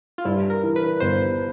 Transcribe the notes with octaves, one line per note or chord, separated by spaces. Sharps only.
F4
G2 E4
A#4
E3
B4
G1 C5